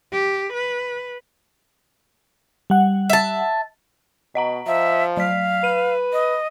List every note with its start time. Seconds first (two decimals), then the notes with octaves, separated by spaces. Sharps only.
0.13 G4
0.54 B4
2.70 G3 F#5
3.10 E5 A5
4.35 B2 D#5 F#5 A#5
4.67 F3 E5
5.17 F#3 F5 B6
5.64 B4 D#7
6.13 D#5